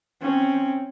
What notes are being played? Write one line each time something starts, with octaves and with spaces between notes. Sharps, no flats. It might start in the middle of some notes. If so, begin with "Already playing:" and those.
C4 C#4